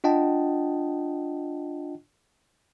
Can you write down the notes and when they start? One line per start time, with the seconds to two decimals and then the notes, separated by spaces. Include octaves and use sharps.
0.04 D4 F4 D#5 F#5 G5 A5